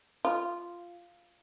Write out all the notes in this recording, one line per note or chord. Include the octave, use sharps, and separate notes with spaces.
F4